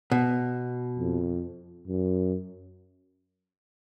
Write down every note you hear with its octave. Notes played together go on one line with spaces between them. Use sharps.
B2
F2
F#2